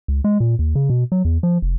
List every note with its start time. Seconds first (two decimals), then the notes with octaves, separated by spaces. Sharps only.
0.08 C#2
0.24 G#3
0.40 A#2
0.59 D#2
0.75 C#3
0.90 B2
1.12 F#3
1.25 E2
1.43 F3
1.62 F1